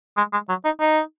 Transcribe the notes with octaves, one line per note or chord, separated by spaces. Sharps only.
G#3
G#3
F#3
D#4
D#4